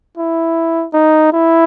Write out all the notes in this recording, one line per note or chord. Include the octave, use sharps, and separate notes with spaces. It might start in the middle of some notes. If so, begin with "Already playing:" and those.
E4
D#4
E4